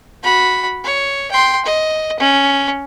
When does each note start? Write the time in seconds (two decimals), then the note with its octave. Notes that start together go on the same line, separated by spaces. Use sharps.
0.23 F#4 B5
0.84 C#5
1.31 G5 C6
1.65 D#5
2.19 C#4